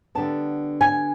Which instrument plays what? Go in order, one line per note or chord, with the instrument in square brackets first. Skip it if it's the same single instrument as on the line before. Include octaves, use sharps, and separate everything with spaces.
[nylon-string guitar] D3 G3 B3 A5
G#5